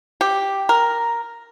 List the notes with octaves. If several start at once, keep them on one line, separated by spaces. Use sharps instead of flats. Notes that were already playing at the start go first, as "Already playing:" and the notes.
G4
A#4